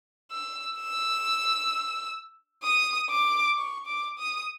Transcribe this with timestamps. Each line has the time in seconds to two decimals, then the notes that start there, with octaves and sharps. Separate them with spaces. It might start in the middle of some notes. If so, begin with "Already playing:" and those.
0.31 E6
0.77 E6
2.64 D#6
3.10 D6
3.57 C#6
3.86 D6
4.18 D#6